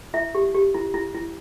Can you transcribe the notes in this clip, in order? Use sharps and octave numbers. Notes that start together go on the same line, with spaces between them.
E4 E5
G4
G4
E4
E4
E4